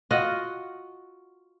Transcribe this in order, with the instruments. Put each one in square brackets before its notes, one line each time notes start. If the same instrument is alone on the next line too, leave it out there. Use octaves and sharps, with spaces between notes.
[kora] F4 F#4 D#5 F#5